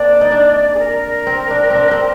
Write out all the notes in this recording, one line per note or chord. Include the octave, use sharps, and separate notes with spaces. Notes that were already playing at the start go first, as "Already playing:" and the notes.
Already playing: A#3 C4 D4 D5
D#4
D4
G#4
A#4
C4
D4
C4 D4
C4